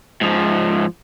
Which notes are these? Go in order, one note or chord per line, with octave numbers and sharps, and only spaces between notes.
G#2 F3